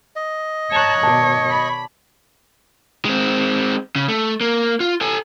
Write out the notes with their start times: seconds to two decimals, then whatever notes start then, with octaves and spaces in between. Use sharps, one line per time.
0.16 D#5
0.72 C#5 A5 A#5 F#6
1.03 B2 D#3 D5 A5
1.49 B5
3.05 G#3 C4
3.96 C#3
4.08 A3
4.41 A#3
4.80 F4
5.01 A4 G#5